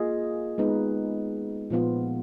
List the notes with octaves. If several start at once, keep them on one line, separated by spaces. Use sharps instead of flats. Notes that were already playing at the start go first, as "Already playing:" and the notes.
Already playing: A#3 F4 G#4 D#5
G#3 B3 D#4 G#4 B4
A#2 F3 B3 F4